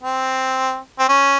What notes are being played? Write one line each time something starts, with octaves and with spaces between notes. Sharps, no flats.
C4
C4
C#4